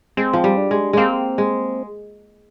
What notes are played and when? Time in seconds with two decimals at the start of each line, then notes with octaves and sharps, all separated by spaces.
0.17 G#3 C4
0.33 F3
0.44 G3
0.57 D4
0.71 G#3
0.93 G#3 A#3 C4
1.38 G#3